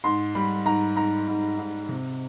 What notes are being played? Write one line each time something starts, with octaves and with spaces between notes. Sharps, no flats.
G#2 C6
G3 B5
G#2 A#5
G#2 A#5
G#2
G#2
C3